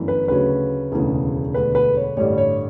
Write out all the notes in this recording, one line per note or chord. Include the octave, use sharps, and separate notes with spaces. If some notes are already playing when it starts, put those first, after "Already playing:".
Already playing: G1 F#2 E3 A3
B4
D2 C#3 F#3 C#4 B4
E1 D2 C#3 E3
E1 D2 D3 B4
B4
C#5
A1 G2 D3 G3 C#5
C#5